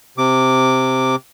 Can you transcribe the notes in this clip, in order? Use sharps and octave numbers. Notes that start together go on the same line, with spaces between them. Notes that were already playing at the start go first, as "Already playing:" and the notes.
C3 D6